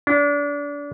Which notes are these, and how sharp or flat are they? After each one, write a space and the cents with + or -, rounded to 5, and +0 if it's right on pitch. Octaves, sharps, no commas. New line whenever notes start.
D4 -30